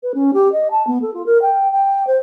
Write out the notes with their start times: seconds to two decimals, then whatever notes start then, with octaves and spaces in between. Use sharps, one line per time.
0.03 B4
0.15 C#4
0.34 G4
0.52 D#5
0.71 A5
0.87 B3
1.02 A4
1.14 F4
1.26 A#4
1.42 G5
1.72 G5
2.07 C5